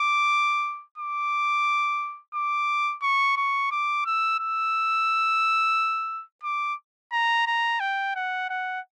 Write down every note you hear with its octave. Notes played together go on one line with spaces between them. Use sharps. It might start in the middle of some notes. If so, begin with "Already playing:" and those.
Already playing: D6
D6
D6
C#6
C#6
D6
E6
E6
D6
A#5
A#5
G5
F#5
F#5